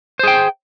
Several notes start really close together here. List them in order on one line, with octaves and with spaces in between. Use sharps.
C5 G#4 G5